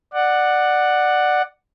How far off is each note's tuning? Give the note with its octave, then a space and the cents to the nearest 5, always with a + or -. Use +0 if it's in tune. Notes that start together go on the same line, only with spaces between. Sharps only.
D5 +15 F#5 +0